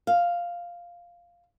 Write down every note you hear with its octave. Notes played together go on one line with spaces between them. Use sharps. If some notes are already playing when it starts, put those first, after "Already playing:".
F5